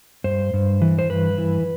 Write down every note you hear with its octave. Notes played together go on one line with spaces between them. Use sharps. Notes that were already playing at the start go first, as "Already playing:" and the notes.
G2 C5
G2
E3
C5
G2 B4
E3